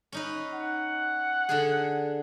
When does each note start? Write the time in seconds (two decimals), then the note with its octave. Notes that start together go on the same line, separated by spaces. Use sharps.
0.12 C#4 D#4 B4
0.53 F#5
1.49 D3 D4 G#4